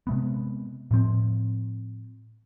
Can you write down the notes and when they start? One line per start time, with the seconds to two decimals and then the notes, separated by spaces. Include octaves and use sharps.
0.07 C3 G#3 B3
0.91 A2 F3 C4